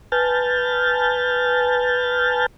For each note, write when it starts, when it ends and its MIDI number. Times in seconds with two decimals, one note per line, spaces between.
0.12 2.46 71
0.12 2.46 80
0.12 2.46 81
0.12 2.46 89
0.12 2.46 91
0.12 2.46 93